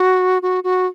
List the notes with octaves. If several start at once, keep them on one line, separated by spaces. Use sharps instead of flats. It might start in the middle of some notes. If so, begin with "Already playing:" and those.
Already playing: F#4
F#4
F#4